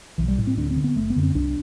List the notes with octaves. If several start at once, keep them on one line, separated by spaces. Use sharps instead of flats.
B1 E3
G3
A2
C4
D2 D4
C4
D3
B3
F#1 A3
B3
F#2 D3
C4
C2 D4